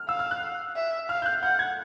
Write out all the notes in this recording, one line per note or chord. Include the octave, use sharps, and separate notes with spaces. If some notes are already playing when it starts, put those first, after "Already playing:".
Already playing: F6
F5 E6
F6
F#6
E5
F5 F6
G6
F#6
F#5 G6
G#6